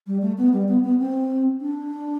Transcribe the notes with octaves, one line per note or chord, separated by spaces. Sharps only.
G3
A3
B3
G3
B3
B3
C4
D4